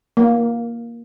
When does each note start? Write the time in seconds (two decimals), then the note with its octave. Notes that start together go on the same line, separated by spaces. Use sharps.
0.17 A#3